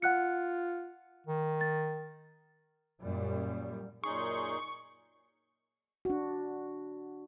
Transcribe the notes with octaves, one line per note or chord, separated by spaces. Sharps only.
F4 F#5 F#6 C#7
D#3
A6
F#2 A#2 G3
F#2 A#2 C#4 D#4 G#4 C6 C#6
D4 F#4